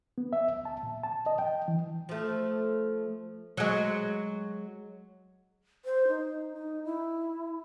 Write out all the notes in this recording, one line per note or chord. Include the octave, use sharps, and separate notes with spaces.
B3
E5
C#2
A5
A#2
A5
D#5
G5
E3
F3 A3
F#3 G#3
C5
D#4
D#4
E4